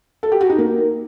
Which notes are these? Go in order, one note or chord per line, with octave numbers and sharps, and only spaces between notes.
A4
G4
F#4
D#4
A#3